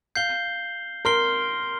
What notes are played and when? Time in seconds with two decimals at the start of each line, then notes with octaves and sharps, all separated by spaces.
0.15 F5 G6 C7 G7
1.05 A#4 C6 F6 C7 G7